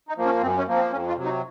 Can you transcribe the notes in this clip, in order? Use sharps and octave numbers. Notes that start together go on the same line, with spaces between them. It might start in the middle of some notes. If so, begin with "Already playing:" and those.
D#4
F3 A#3
C#4
F#2 C4
C#4
F3 A#3
C4
F2 C#4
F4
C3 F#3
D#4